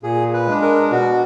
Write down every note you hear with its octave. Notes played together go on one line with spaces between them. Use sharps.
A#2 G#4
B4
G#3 D4
A#4
B2 F#4